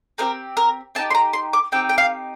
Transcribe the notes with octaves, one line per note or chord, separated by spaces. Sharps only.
C4 D#4 G4 A#4
A#4
C4 D#4 G4 A5
C6
A#5
C6
D6
C4 D#4 G4 G5
G5
F5